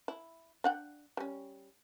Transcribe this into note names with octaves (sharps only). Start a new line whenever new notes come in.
E4
D4 F#5 G5
G3 C#4